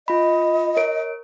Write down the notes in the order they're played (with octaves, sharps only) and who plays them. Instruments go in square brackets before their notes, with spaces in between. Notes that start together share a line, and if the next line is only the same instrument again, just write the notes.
[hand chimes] F4 B5 [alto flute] D#5
[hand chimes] A#4 C#5 D7